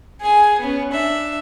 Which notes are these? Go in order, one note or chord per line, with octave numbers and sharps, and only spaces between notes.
G#4 G#5
B3 C#4
D4 E5